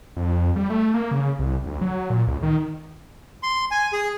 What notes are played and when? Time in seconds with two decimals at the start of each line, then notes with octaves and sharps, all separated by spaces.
0.17 F2
0.56 G3
0.70 A3
0.94 A#3
1.11 C#3
1.39 C2
1.66 D2
1.81 F#3
2.10 A#2
2.27 C#2
2.43 D#3
3.43 C6
3.71 G#5
3.93 G#4